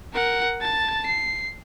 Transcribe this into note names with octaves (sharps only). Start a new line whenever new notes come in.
A#4 F#5
A5 A6
C7